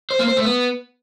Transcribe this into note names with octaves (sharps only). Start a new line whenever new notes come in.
C5
A#3
C5
A3
B3